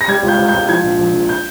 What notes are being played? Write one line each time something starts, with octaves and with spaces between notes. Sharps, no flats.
A#6
G3 G#6
C#2
G6
C#2
G6
C#2
F3 G#6
A#1
A#1
A#1
G6